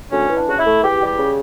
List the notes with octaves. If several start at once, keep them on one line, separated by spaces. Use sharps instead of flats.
D2 C#4
E3
D4
C#3 F#4
E4
A3
E2 G4
G3
G4
C#3